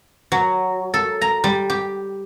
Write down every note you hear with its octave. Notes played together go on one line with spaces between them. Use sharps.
F#3
A4
A#5
G3
G4